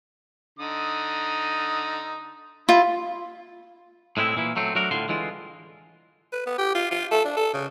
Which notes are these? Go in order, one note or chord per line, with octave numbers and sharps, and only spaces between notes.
D3 D#4 D#6
E4 F4
A2 G#3 C4 E4
A#2 E3 A#3 E4
F#3 A3 C4
F#3 A3 D4 F#4 A#4
A2 D3 F4 C6
D3 E3 G#3 F4
B4
B3
G4
F4
F4
A4
D4
A4
C#3